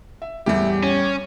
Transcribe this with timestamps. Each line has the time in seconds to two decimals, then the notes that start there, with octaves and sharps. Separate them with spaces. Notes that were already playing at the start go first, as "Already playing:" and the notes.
0.22 E5
0.46 E2 A2 G3 B3 G4 E5
0.84 C#4 C#5